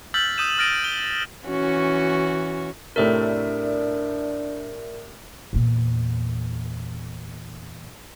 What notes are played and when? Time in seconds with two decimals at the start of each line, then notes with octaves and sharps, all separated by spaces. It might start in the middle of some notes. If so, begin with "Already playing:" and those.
0.14 E6 F6 G6 A6 B6 F#7
0.38 D#6 E6 G6 D#7 E7
0.58 D#6 F6 A6 A#6 D7 D#7
0.82 D#7 G7
1.47 E3 C#4 F#4
2.96 A2 C3 A3 D4 A#4 D5 E5
5.53 E2 A#2